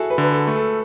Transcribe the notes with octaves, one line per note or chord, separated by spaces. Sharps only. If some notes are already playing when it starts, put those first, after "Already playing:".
Already playing: E4 F#4 G#4 A4
B4
D3
B4
A4
A3
A4